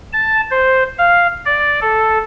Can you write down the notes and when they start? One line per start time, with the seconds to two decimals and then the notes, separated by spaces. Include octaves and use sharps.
0.13 A5
0.51 C5
0.98 F5
1.45 D5
1.82 A4